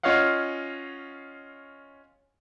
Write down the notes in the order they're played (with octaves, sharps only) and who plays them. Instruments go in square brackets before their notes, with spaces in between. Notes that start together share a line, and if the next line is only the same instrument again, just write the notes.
[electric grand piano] C#4 F4 C#5 D#5 F5 F#5